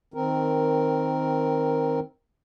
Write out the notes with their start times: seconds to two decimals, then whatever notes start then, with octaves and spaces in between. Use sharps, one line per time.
0.14 D#3 C4 A#4